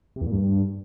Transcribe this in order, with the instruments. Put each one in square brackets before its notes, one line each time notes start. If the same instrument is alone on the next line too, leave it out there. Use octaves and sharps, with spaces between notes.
[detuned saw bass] C3
E2
A#2
G2